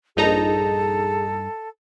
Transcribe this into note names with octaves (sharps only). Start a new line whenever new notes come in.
A#1 G2 D#4 G#4 A4 A#5